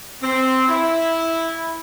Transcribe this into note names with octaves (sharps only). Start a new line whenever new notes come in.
C4
E4